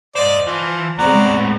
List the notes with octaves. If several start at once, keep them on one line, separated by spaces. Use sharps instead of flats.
C5 D5 D#5
E3 F3
A2 G#3 B3 C4 D5 A#5